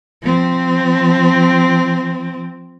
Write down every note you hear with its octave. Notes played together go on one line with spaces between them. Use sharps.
F3 C4